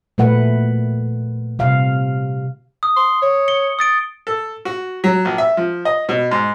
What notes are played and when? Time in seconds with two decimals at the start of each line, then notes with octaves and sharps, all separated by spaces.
0.18 A#2 A3 B4 F#5
1.59 C3 F5
2.83 D#6
2.96 C6
3.22 C#5
3.48 C#7 G7
3.79 D#6 A6 D7
4.27 A4
4.65 F#4
5.04 F#3
5.25 A#1
5.38 E5
5.57 F3
5.85 D#5
6.09 B2
6.31 G#2